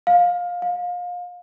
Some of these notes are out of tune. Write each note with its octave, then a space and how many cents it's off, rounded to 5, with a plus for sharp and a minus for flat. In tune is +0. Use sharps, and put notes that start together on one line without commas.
F5 +20
F5 +30